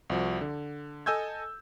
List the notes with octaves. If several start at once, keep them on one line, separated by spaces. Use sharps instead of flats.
C2 F3 F#4
D3
A4 D#5 G#5 E6 G6 G#6